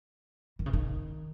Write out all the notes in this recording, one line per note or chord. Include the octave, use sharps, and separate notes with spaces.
D#3
C#3
D#3